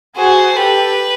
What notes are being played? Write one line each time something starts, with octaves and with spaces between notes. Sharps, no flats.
F#4 G#4 C5
G4 A4 B4